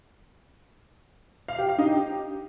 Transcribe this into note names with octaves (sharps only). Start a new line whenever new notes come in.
F5
G4
F5
D#4
G4